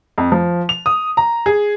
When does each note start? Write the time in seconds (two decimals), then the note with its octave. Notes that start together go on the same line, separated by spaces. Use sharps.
0.18 F2
0.32 F3
0.69 F7
0.86 D#6
1.17 A#5
1.46 G#4